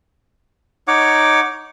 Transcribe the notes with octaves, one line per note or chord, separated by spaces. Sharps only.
D#4 C#5 F#5 D6